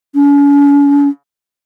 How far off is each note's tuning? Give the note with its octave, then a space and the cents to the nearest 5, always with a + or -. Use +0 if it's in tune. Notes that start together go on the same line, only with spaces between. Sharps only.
C#4 +40